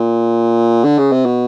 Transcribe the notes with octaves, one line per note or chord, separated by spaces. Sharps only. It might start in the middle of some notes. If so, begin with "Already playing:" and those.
Already playing: A#2
D3
C#3
C3
B2